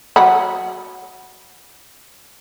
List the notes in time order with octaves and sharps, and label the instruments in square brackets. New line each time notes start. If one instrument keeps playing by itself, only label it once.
[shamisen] F#3 F#5 B5